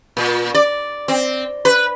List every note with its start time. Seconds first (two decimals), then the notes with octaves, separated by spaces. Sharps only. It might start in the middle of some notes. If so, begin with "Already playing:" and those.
0.17 A#2
0.55 D5
1.08 C4
1.65 B4